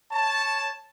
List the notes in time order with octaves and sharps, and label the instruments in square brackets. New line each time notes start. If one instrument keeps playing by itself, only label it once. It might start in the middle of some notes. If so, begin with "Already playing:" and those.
[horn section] C#5 A5